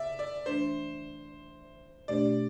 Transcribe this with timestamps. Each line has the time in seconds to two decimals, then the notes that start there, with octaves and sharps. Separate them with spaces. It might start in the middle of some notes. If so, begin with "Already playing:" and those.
Already playing: D5 E5
0.19 D5
0.46 E3 A3 D4 C5
2.08 B2 A3 D4 G4 C5 D5